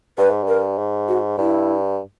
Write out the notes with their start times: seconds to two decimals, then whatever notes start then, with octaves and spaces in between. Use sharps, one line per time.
0.18 G2 B4
0.30 G#2
0.43 G2 A#4
0.78 G#2
1.08 F#4
1.38 G2 E4